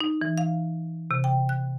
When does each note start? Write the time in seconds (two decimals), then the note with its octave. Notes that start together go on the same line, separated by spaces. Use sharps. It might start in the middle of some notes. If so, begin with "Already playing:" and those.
0.01 D#4
0.21 E3
0.38 F5
1.11 C3
1.24 G5
1.49 F#6